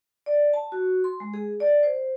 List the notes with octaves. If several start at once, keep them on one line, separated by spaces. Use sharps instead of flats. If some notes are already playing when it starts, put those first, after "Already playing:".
D5
A5
F#4
C6
G#3
G#4
D5
C5